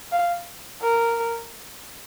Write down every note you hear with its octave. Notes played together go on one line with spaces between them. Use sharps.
F5
A#4